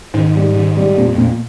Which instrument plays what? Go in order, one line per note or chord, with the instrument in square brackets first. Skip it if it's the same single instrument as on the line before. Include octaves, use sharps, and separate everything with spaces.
[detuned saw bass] G#2 [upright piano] D#3
[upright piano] G3
D#3
G3
[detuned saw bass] F2 [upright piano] A#2
[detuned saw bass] F2
[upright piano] A#2